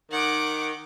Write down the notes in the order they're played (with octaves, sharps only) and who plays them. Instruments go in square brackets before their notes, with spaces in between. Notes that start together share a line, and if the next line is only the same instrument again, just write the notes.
[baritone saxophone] D#3 [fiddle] F#5 D6